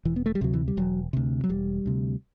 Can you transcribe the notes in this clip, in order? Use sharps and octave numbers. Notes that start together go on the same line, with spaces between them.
E1 E3
B3
A3
G3
D2 C3 F#3
E3
G3
E1 F#3
D2 C3
F#3
E1 G3
D2 C3